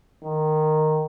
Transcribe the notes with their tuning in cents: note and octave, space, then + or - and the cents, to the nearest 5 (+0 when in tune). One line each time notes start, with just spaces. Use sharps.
D#3 -10